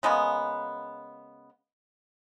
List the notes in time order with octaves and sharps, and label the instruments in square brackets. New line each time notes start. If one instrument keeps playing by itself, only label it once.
[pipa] C#3 G#3 A#3 B3